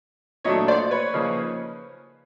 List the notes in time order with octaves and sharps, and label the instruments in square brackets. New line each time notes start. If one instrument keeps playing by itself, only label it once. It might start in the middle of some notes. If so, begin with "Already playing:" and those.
[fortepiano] A#2 F#3 A3 D4 C#5 D#5
C5 D5
B4 C#5
C#3 F3 A#3 D#4